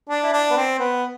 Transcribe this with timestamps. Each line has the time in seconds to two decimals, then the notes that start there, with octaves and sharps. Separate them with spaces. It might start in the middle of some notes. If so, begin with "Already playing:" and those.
0.09 D4
0.23 E4
0.32 D4
0.50 B3
0.56 C4
0.79 B3